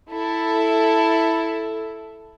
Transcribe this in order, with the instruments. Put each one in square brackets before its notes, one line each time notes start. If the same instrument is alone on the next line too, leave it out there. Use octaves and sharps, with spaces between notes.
[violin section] E4 A4